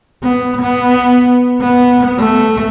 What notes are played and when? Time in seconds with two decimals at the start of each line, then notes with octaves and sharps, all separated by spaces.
0.23 B3
0.61 B3
1.61 B3
2.18 A3